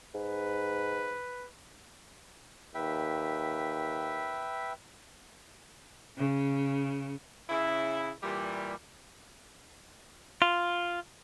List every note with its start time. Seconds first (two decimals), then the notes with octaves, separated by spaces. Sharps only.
0.14 G#2 B4
2.74 D#2 B4 E5 G5
6.17 C#3
7.50 C#3 E4
8.22 A#2 E3 G3
10.42 F4